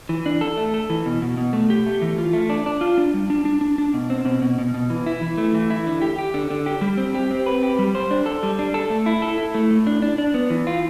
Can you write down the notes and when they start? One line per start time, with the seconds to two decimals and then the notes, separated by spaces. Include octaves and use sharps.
0.09 E3
0.26 D4
0.41 A4
0.57 A3
0.74 A4
0.90 E3
1.06 B2
1.22 B2
1.37 B2
1.53 A3
1.70 G4
1.86 A3
2.02 E3
2.18 F4
2.33 A3
2.50 D4
2.66 D4
2.81 F4
2.98 D4
3.14 G3
3.30 D4
3.45 D4
3.61 D4
3.78 D4
3.94 B2
4.10 C4
4.25 B2
4.42 B2
4.58 B2
4.74 B2
4.90 E3
5.06 E4
5.22 E3
5.38 A3
5.54 E3
5.70 E4
5.87 D3
6.02 G4
6.19 G4
6.34 D3
6.50 D3
6.66 G4
6.81 G3
6.98 C4
7.14 G4
7.31 C4
7.46 B4
7.63 G4
7.79 G3
7.95 C5
8.11 D4
8.26 A4
8.43 G3
8.59 D4
8.74 A4
8.90 A3
9.06 E4
9.22 A4
9.38 E4
9.55 A3
9.71 A2
9.87 D4
10.02 D4
10.18 D4
10.34 B3
10.50 E3
10.67 F4